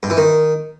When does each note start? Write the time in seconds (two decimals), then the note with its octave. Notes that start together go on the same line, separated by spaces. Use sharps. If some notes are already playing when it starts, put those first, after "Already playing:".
0.03 G2
0.10 E3
0.17 D#3